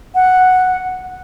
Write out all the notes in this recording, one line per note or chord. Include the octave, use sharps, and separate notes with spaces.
F#5